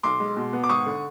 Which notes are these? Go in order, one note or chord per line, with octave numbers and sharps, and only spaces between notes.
B1 C6 D6
G#3
B2
B3
D6
G#1 C#6 D#6
D3